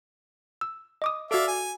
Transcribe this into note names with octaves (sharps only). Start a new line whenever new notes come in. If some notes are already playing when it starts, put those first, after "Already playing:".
E6
D#5 D6 D#6
F#4 A4 D5 E5 F5
G#5